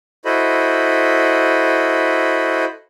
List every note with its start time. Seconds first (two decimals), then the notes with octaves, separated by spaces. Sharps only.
0.25 E4 F#4 A4 C5 D#5 B5